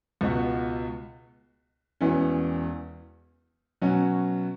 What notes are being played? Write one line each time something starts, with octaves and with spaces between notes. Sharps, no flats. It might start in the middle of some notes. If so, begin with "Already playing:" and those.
C#2 B2 B3 F#4
E1 E2 E3 C#4
B2 F#3 C#4 F#4